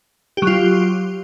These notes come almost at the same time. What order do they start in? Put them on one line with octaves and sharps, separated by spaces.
G4 F#3 F4